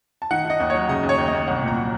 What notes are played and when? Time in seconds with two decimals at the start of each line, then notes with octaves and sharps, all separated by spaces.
0.22 A5
0.31 D#3 F#5
0.45 D#3 D#5
0.60 D#2
0.70 F#3 C#5
0.89 C#3 D#5
1.03 D#2
1.09 C#5
1.18 D#2
1.28 D#5
1.33 D#2
1.48 C2 F#5
1.62 A#2
1.68 A#5
1.76 F#3